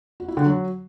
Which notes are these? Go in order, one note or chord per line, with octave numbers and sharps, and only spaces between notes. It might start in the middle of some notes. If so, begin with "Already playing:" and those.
F#4
E4
D3
F#3